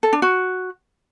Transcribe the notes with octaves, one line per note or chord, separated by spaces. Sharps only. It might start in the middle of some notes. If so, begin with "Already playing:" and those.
A4
D4
F#4